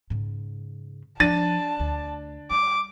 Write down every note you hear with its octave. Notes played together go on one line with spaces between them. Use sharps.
G#2 C#3
F3 D4 A5 A6 D#7
D2
G3 D6